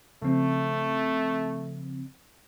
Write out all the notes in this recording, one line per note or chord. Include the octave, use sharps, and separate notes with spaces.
C#3 F3 A3 C4